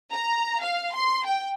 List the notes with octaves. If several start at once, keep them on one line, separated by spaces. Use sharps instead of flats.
A#5
F5
C6
G5